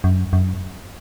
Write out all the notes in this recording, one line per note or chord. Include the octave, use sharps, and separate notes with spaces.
F#2
F#2